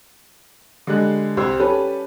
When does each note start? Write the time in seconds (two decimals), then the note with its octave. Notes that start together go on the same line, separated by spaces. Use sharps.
0.87 D3 G3 G#3 F#6
1.37 C2 G4 C5 C6 E6 G#6
1.60 G3 C#4 G4 A4 B4